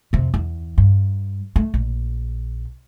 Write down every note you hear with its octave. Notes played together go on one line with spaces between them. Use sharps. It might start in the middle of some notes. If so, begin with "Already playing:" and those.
F2 C3
E2
G2
A3
A#1